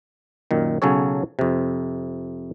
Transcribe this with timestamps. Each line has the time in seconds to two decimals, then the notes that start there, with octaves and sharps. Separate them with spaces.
0.51 F#2 A#2 D#3
0.82 B1 C#3 F#3 C#4 A4 C#5
1.39 F2 C3